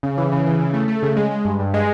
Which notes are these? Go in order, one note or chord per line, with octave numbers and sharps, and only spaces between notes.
C#3
E3
C#3
E3
C#3
A3
A3
C#3
G#3
G#3
G2
G2
G#3